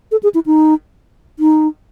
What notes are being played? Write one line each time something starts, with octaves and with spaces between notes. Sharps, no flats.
A4
G#4
E4
D#4
D#4